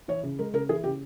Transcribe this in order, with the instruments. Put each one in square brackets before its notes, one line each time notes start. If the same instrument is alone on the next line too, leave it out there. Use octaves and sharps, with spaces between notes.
[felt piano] E3 C#5
C#3
G#3 A#4
C#3 A#4
E3 G#4
C#3 G4